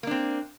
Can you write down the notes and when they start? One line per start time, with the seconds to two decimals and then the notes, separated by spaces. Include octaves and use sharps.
0.03 A#3
0.07 D4
0.11 C4